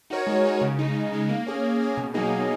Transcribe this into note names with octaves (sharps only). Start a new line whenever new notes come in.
D#4 F#4 A#4 C#5
G#3
D#4 F#4 A#4 C#5
C#3
G#3 D#4
C#3
G#3 D#4
A#3
C#4 G#4
A#3
C#4 G#4
B2
F#3 A#3 D#4 G#4
B2